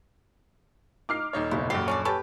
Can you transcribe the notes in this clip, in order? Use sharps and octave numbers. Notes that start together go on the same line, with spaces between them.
D#4 D6 F6 C7
D#1 D#4 C#5
F#1 B1 E4
D#1 F#2 G4 C7
C#4 D4 D5
C#4 G4 A4 B4 A5